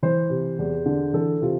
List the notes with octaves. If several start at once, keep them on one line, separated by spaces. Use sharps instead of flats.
E3 C5
C3
E2
D3
E3 A4
C3 F4